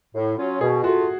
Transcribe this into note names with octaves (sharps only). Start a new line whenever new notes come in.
A2
F#3 C#4 F4
B2 G#4
A3 F4 F#4